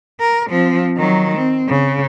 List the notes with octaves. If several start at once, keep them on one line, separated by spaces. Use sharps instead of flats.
A#4
F3 C4
D#3 F#3
C4
C#3